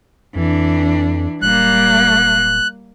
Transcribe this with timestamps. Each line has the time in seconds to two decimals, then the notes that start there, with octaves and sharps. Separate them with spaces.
0.35 F2 E3 D4
1.42 D1 G3 A#3 F#6